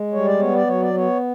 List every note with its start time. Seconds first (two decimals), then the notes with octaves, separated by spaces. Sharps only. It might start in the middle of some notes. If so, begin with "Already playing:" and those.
Already playing: G#3
0.13 G3 C#5
0.27 D5
0.39 B3 C#5
0.55 D5
0.67 F#3 C#5
0.82 D5
0.94 B3 C#5